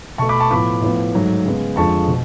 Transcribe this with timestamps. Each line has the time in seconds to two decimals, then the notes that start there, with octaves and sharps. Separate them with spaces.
0.18 B2 A3 A5 C#6
0.29 B5 D6
0.40 A5 C#6
0.51 A2 F3 B3 B5 D6
0.82 A2 F3 B3
1.14 G#2 F#3 A3
1.44 C#3 G#3 B3
1.76 F2 D3 F3 G#3 A5 C#6
2.08 B2